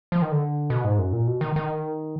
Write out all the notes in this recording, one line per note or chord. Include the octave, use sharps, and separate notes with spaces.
F3
D#3
D3
B2
G#2
F#2
A#2
B2
D#3
D#3